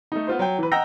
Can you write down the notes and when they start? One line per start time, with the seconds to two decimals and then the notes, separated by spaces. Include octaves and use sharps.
0.12 A3 D#4
0.27 B3 F4 C5
0.39 F#3 G5
0.58 E3 B4
0.72 D#5 F#5 G5 A#5 E6 A#6